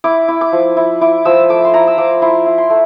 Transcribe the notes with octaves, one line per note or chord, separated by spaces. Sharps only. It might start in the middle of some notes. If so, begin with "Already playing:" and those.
E4 D6
E4
D6
F3
E4
E4 D6
F3 E6
A3 D6
C6
E4 A#5
E6
F3 D6
E4 C6
E4
C6
A3